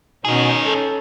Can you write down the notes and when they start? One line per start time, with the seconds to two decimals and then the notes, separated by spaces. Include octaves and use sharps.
0.25 B2 D#3 C#4 D#4 G#4
0.66 A4